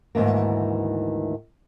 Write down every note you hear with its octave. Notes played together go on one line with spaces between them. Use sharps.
D2 G#2 D#3 E3 A#3